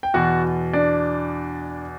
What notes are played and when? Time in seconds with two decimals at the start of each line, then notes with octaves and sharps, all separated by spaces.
0.03 G5
0.14 E2 B2 F#4 F#5
0.73 D4 D5